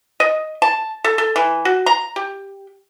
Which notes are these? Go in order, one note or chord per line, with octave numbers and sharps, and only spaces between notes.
D#5
A5
A4
A4
E3
F#4
A#5
G4